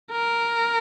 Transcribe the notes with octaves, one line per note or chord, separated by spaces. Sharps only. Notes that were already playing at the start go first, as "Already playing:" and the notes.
A#4